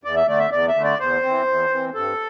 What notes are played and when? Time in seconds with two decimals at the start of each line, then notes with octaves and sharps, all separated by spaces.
0.04 E2 D5
0.16 E5
0.27 D3 A3 D5
0.39 E5
0.51 E2 D5
0.68 E5
0.76 D3 A3
0.84 D5
0.99 E2 C5
1.23 E3 C4
1.47 E2
1.70 E3 C4
1.94 G2 A4